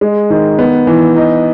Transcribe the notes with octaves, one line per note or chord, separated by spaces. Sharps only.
G#3
D#3
B3
E3
D#4